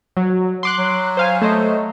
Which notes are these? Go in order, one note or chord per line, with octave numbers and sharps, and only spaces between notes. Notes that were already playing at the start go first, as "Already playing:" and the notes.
F#3
C6 D6 F#6
F#3
C5 F5 G#5
A3 C5 D#5